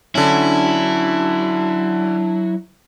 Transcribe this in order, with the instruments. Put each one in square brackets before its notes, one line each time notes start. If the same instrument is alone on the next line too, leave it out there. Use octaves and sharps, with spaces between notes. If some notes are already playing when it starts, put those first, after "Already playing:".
[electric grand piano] D3 C#4 [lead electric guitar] F#3 [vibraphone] D4 A5 [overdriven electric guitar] E4